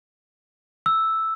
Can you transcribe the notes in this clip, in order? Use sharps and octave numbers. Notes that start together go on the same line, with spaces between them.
E6